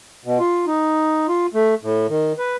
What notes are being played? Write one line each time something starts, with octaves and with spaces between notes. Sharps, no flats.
B2
F4
D#4
F4
A3
A2
D#3
B4